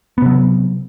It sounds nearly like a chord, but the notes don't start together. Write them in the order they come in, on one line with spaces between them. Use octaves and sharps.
B3 C3 F#3